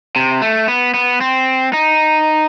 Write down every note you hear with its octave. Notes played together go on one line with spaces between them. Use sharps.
C3
A3
B3
B3
C4
D#4